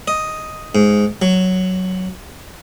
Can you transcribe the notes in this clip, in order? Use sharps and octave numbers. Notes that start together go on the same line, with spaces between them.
D#5
G#2
F#3